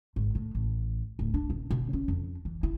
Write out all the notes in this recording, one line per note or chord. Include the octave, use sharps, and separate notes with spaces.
G#1
A2
A1
D1
D4
D#1
B2
C#4
F2
E3
E4